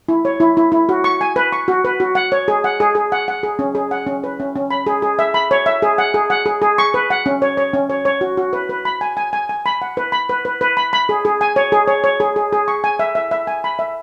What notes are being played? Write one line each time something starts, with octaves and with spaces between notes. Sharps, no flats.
E4
C#5
E4
E4
E4
F#4
C#6
G#5
B4
C#6
F#4
B4
F#4
F#5
C#5
G#4
F#5
G#4
G#4
F#5
F#5
G#4
C#4
G#4
F#5
C#4
B4
C#4
C#4
B5
G#4
G#4
E5
B5
C#5
E5
G#4
F#5
G#4
F#5
G#4
G#4
C#6
B4
F#5
C#4
C#5
C#5
C#4
C#5
C#5
F#4
F#4
B4
B4
B5
G#5
G#5
G#5
G#5
B5
F#5
B4
B5
B4
B4
B4
B5
B5
G#4
G#4
G#5
C#5
G#4
C#5
C#5
G#4
G#4
G#4
C#6
G#5
E5
E5
E5
G#5
B5
E5